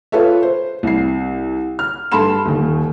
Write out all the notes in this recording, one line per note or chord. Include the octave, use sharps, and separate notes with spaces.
F4 A4 B4 C#5 E5
C5
C2 C7
F6
G2 A4 A5 B5 C6 E7
D#1 D#2